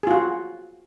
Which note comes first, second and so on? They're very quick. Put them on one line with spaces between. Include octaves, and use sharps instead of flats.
G#4 F4 F#4